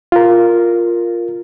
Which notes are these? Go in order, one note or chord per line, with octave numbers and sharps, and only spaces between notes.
F4 A#4